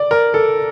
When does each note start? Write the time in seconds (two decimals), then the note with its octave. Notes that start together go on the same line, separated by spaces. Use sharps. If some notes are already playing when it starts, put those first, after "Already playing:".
Already playing: D5
0.11 A#4
0.34 A4